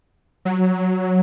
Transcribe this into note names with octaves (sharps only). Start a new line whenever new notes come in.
F#3